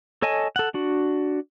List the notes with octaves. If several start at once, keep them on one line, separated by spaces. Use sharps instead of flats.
A4 C#5 D#5 G#5 A5
A4 F#5
D4 F#4